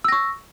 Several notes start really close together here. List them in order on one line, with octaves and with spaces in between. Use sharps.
E6 A#6 C#6